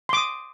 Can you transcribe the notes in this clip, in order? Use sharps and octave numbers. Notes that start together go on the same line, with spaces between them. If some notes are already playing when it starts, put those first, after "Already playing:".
C6 D6 D#6